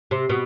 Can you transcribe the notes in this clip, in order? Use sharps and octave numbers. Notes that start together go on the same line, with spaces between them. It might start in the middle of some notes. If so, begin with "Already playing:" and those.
C3
B2